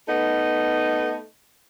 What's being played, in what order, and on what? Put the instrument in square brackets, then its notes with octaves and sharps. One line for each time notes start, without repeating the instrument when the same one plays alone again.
[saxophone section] A3 B3 D#4